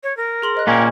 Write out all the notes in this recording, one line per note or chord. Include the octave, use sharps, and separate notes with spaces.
C#5
A#4
G#4 C6 F#7
C5 D#5 F#6
A#2 A#3 C#4 G5